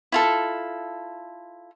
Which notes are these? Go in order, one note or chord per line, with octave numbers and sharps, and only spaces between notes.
E4 F4 A4